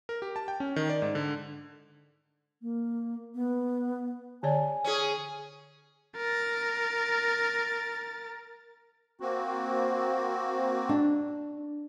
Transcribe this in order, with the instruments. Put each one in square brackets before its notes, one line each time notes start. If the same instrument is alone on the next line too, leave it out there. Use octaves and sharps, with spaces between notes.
[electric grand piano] A#4
G4
A5
G5
C#4
D#3
D5
G#2
D3
[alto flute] A#3
B3
[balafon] D3 C#5 D5 [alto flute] G#5
[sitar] C#4 G#4
[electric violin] A#4 A6
[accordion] A#3 C4 F#4
[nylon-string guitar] D4